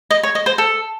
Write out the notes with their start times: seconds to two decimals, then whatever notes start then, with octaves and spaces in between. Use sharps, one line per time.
0.11 D#5
0.23 C#5
0.35 D#5
0.46 C5
0.58 A4